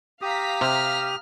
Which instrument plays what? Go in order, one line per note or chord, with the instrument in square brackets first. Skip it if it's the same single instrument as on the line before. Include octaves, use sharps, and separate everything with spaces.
[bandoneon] G4 D#6 [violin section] F5 A#5 B6
[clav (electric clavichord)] C3 [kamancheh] F6